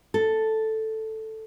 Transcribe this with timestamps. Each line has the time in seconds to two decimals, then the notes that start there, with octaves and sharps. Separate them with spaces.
0.14 A4